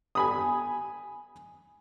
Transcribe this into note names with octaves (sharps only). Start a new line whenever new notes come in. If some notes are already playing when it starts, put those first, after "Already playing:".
G#5 B5 D#6